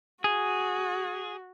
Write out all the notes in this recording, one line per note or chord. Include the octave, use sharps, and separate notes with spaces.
F#4 G#4